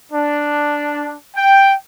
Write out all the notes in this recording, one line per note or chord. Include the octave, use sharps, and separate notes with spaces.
D4
G5